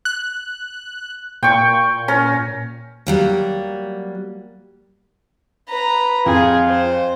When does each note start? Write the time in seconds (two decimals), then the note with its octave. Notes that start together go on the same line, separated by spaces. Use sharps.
0.05 F#6
1.43 A#2 G5 C#6
2.08 C#4 A#4
3.07 F#3 G3 A#3
5.68 B4 A#5
6.26 F2 F4 G#4
6.67 C5